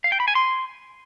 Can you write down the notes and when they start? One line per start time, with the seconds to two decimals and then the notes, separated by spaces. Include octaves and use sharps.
0.04 F5
0.12 G5
0.20 B5
0.28 G#5
0.35 C6